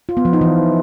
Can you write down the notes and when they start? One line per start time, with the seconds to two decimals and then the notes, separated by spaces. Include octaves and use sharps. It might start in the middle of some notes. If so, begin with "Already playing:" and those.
0.09 F4
0.17 B3
0.25 F3
0.33 D#4
0.41 E3